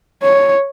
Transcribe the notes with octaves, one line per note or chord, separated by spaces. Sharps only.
C#5